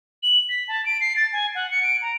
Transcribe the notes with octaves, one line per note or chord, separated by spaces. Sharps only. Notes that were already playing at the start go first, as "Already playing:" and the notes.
F#7
B6
A5
D7
C7
A6
G#5
F#5
C#7
D7
A#5